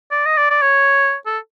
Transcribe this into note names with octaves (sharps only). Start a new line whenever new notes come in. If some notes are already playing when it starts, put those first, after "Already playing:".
D5
D#5
D5
D5
C#5
A4